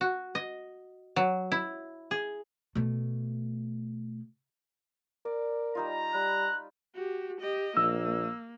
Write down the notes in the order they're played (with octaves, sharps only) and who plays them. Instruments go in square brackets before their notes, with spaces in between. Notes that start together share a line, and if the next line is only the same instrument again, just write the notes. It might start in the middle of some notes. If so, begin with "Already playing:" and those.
[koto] F#4
D#5
F#3
E4
G#4
[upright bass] B2 A3
[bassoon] A#4 [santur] D5
[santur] G3 D#4 F4 [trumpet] A#5
[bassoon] G3 [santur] B5 [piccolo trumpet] F#6
[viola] F#4 G4
G4 D#5
[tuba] A#1 [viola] A#3 [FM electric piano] E6